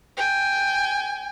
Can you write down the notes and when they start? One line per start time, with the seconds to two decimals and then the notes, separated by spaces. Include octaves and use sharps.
0.17 G5 G#5